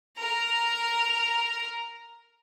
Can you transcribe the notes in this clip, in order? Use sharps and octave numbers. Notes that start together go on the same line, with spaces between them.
A#4 A#5